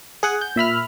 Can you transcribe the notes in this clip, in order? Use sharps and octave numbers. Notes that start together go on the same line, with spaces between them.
G#4 F#5 G#5
G6
A#2 E5 B5 F6